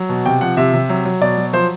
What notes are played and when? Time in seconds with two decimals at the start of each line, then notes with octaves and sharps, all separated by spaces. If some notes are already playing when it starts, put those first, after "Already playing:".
Already playing: F#3
0.09 B2
0.26 C3 G5
0.41 F3 F#5
0.57 C3 E5
0.73 C3
0.89 F#3
1.05 F#3
1.21 B2 D5
1.37 F#3
1.53 F3 C5